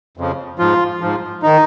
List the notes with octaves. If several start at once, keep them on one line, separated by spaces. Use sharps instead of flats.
F2 C#3 F3
G#2 F3 F4
G#2 F3
D#3 D#4